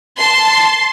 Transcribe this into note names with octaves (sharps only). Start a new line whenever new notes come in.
A5 C6